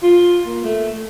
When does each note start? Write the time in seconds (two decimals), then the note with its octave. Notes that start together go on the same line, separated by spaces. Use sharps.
0.03 F4
0.46 A#3
0.64 A3